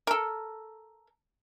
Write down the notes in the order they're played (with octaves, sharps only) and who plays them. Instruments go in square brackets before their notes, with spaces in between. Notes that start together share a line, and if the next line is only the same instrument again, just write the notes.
[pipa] A4 A#4